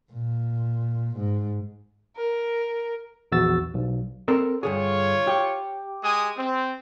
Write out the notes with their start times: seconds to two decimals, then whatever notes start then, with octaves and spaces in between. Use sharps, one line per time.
0.12 A#2
1.17 G#2
2.16 A#4
3.32 A#1 E2 F#4 E6 A6
3.74 B1
4.28 C4 A4 A#4
4.63 G2 D3 F4 G#4 C#5
5.27 G4
6.02 G#3 G#5 D#6
6.37 C4